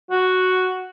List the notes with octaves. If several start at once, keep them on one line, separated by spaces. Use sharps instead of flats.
F#4